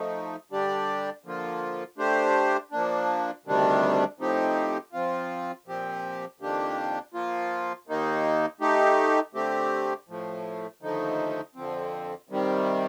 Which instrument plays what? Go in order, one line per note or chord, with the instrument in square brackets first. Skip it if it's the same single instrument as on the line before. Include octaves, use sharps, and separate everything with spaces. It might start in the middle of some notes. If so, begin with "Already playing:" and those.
Already playing: [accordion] F3 A3 D#4
D3 G3 D4 G4 D5
D3 F3 A#3 F4
A3 D4 G4 C5
F3 A#3 D4
D2 C3 D#3 G3 D4
A2 F3 C4 D#4 G4
F3 C4 F4
A#2 F3 C4 G4
F2 D#3 A#3 D4 G4
F3 A#3 F4
D#2 D#3 A#3 D#4
A3 D#4 G4
D3 A3 C4 G4
A2 F3 A3
D#2 D3 F3 A3 D#4
F2 D3 F3 C4
C3 D#3 G3